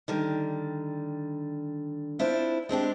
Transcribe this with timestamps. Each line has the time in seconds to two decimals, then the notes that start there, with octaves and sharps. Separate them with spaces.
0.08 D3 D#3 G3
2.19 C4 D4 E4 F4
2.69 G#3 C4 D4 G4